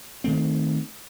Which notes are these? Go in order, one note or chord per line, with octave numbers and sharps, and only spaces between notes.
D#3 A3 C4